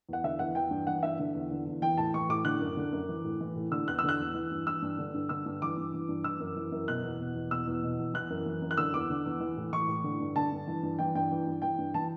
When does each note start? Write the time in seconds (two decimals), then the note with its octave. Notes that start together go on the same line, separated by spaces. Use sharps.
0.09 E2 F#5
0.24 D3 E5
0.39 E2 F#5
0.55 E3 G5
0.71 G2
0.87 E3 F#5
1.03 G2 E5
1.19 D3
1.34 E2
1.51 D3
1.67 E2
1.82 E3 G5
1.98 A2 A5
2.14 E3 C#6
2.29 A2 D6
2.45 D3 F#6
2.60 F#2
2.77 D3
2.92 F#2
3.09 E3
3.24 A2
3.41 E3
3.56 A2
3.71 D3 E6
3.88 E2 F#6
3.99 E6
4.04 D3 F#6
4.20 E2
4.34 E3
4.51 G2
4.67 E3 E6
4.82 G2
4.99 D3
5.14 G2
5.29 D3 E6
5.46 G2
5.62 E3 D6
5.77 G2
5.94 E3
6.09 G2
6.24 E3 E6
6.40 F#2
6.56 E3
6.72 F#2
6.88 B2 F#6
7.03 E2
7.20 B2
7.35 E2
7.51 B2 E6
7.67 E2
7.83 B2
7.99 E2
8.14 E3 F#6
8.30 F#2
8.46 E3
8.62 F#2
8.71 F#6
8.77 D3 E6
8.93 E2 D6
9.10 D3
9.26 E2
9.40 E3
9.57 A2
9.73 E3 C#6
9.88 A2
10.04 D3
10.20 G2
10.36 D3 A5
10.52 G2
10.67 E3
10.83 G2
10.99 E3 G5
11.15 G2 G5
11.31 E3
11.47 G2
11.62 E3 G5
11.79 G2
11.94 E3 A5